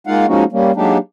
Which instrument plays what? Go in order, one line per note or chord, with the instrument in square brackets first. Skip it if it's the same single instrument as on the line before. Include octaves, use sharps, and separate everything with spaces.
[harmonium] G#3 A#3 D#4 F4 F5 F#5
F3 G#3 A#3 C#4 D#4 F#4
G3 A#3 C#4
F#3 G#3 A#3 D4 D#4 G4